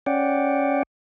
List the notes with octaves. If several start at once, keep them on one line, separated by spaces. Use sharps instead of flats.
C#4 D5 F#5 G5